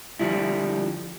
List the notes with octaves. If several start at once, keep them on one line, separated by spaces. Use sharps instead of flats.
D3 F3 G3 E4